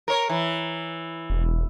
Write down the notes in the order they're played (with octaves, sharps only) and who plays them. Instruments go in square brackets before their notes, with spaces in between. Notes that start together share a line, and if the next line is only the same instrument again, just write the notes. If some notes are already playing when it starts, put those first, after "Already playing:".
[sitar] A#4 C#5
E3
[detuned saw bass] E1